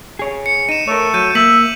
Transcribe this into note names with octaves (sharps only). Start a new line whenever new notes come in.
G#4 C#5
C#7
D#4 D#7 E7
A3 A#4 C#5
F#3 G6 D#7
A#3 E5 B6 F#7